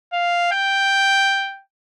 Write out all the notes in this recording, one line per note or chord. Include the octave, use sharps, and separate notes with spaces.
F5
G5